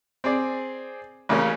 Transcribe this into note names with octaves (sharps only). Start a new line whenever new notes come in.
C4 G#4 D5
A1 C#3 A#3 C#4